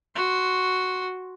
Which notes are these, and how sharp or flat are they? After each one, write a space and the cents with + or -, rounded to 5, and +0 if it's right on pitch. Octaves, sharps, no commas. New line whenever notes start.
F#4 +0 C6 +5